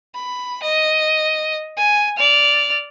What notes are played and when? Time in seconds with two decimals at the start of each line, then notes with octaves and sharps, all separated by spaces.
0.15 B5
0.63 D#5
1.77 G#5
2.16 D5 F6